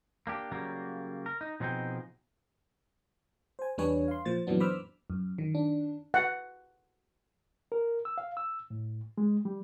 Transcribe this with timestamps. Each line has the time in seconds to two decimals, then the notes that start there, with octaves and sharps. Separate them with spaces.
0.27 A#3 D4 G4
0.52 C#3 F#3 G3 A#3
1.26 A#4
1.41 D#4
1.60 B2 F3 C4 D#4 G#4 G5
3.59 C5 G#5
3.78 E2 G3 D4 B4 C#5 G#5
4.08 F5 C6
4.25 A#2 F3 C5 A6
4.47 F#2 A#2 E3 F#3 B3 D4
4.60 C5 B5 D6 E6 F6
5.10 F#2
5.38 D#3
5.55 D4
6.14 F#5
7.72 A#4
8.05 E6
8.18 F5
8.37 E6
8.70 A2
9.18 G#3
9.45 G3